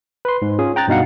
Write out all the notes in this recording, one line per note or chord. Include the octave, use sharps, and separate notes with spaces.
B4 C6
G#2
C#4 F4 G#4
G5 A#5 F#6 A6
G2 B2 D#4 F5 F#5